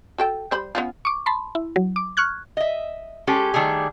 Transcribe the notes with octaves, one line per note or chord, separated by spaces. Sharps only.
F#4 A4 G5
G3 C5 B5
B3 C#4 F4
C#6 D6
A5 B5 C6
E4
F#3
D6
C#6 F6 F#6 G#6
D#5 E5
G#3 C#4 G4 A4
D#3 G3 A3 G#4